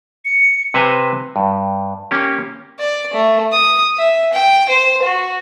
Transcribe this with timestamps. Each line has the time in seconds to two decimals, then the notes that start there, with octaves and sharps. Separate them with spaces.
0.25 C#7
0.74 C3 B4 C5 G#5 A#5
1.36 G2
2.11 A#3 C#4 G4
2.79 D5
3.13 A3
3.52 D#6
3.98 E5
4.33 G5
4.69 C5
5.02 F#4